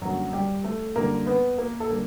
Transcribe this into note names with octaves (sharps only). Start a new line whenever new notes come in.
F#2 D3 F#3 G3 A#3 F#4
G3 G4
A3 A4
F#2 D3 G3 A#3 A#4
B3 B4
A#3 A#4
A4
D3 G3 A#3 A#4